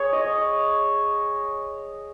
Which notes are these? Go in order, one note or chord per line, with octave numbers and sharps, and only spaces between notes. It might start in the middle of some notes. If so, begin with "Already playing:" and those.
Already playing: G#4 C#5
D#5